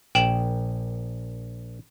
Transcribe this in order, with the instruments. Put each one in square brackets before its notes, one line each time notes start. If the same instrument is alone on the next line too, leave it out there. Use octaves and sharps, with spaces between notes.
[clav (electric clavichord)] A#1 [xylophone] G5 E7 F#7